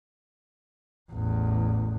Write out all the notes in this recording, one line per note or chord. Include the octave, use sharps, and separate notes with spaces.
A1 E2